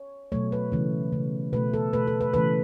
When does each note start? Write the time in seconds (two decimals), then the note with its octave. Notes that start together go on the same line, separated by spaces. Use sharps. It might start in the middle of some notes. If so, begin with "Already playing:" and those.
Already playing: C#5
0.32 B2 F#3 A3 C#5
0.52 B4
0.72 C#3 E3 A3
1.12 C#3 A3
1.53 B2 A3 B4
1.74 A4
1.93 B2 A3 B4
2.07 A4
2.21 B4
2.34 C#3 E3 A3 B4